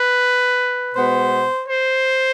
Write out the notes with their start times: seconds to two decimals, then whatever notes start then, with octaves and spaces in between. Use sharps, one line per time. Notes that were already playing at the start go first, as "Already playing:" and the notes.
Already playing: B4
0.95 B2 G#3 B3 C5
1.69 C5